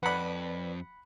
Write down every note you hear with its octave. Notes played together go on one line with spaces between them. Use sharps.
F2 B4 D5 F#5 B5